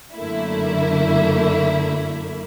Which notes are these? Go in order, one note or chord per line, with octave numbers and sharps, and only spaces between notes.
F#2 D3 A3 A#3 E4